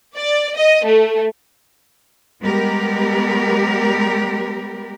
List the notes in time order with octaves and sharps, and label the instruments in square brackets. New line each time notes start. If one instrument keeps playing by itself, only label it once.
[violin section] D5
D#5
A3
[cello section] G3 G#3 B3 G4 A#4